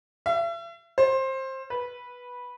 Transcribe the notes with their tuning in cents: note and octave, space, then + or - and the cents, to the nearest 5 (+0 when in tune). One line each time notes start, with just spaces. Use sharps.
E5 +40
C5 +20
B4 -10